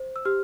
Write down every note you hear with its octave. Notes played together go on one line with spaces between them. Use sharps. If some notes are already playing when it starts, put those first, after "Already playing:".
Already playing: C5
E6
G4 F6